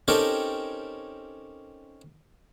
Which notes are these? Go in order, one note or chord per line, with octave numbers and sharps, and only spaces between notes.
C4 C#4 D#4 G4 A4 A#4